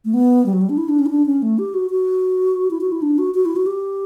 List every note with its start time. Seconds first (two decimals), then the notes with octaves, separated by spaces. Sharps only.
0.05 A3
0.14 B3
0.46 G3
0.53 F#3
0.61 G3
0.69 D4
0.78 E4
0.89 D4
0.99 C#4
1.06 E4
1.10 D4
1.26 C#4
1.42 A3
1.58 G4
1.74 F#4
1.90 F#4
2.71 E4
2.81 F#4
2.92 E4
3.02 D4
3.18 F#4
3.34 F#4
3.45 E4
3.56 F#4
3.66 G4